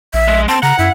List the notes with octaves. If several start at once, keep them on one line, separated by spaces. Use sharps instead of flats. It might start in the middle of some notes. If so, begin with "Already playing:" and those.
A#1 E5
G#3
C4 A5
C#3 F#5 A#5
F#2 E4